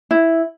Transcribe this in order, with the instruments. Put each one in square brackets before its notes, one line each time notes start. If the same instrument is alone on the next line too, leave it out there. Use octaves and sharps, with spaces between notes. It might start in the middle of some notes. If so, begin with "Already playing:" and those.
[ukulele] E4